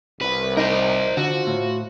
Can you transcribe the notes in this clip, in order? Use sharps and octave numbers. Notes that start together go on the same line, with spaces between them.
C2 B4
D#4 A#4 C5
D3 F4 F#4 C5
A2